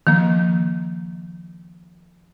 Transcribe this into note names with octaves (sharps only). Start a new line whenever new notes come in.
D#3 F3 A#3